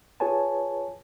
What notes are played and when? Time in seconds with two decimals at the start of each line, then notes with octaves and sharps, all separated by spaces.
0.20 F4 G#4 B4 C#5 G#5 A5